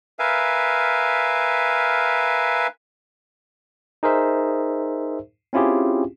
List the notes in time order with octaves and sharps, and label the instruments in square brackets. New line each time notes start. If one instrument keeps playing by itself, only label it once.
[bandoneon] A#4 B4 E5 F5 G#5
[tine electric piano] D#4 G#4 A#4 C5 E5
C4 C#4 E4 F4 G4 G#4